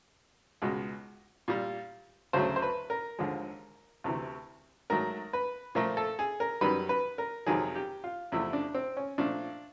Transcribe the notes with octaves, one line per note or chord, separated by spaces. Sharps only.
C#2 B2 G#3
A#2 G3
D2 C#3 F#3 A3 C5
C5
B4
A#4
D#2 D3 F3 G#3
D2 C3 E3 A3
G#2 D#3 F#3 A3 A#4
B4
A#2 F3 A3 A#4
A4
G#4
A#4
F#2 D#3 G3 B4
B4
A#4
F2 C3 D#3 F#3 G#4
G4
F4
E2 C3 F3 A3 E4
D4
C4
C#4
A#2 F3 A3 D4